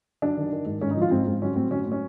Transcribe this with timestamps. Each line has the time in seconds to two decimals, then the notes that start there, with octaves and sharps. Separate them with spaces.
0.22 F#3 D4
0.37 D#3
0.52 D#3
0.66 G#2
0.81 G#2 C#4
0.91 D#4
0.96 F3
1.01 F4
1.11 G#2 C4
1.27 G#2
1.42 F#3 C#4
1.56 A2 C4
1.71 F#3 C#4
1.86 A2
1.92 C#4